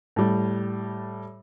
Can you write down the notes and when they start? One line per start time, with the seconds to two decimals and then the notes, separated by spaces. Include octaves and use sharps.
0.16 A2 G3